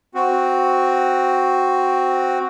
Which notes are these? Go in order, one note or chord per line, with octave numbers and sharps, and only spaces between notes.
C4 F#4